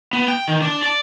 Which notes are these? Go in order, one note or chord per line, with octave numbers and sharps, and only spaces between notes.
B3
G5
D#3
D4
D5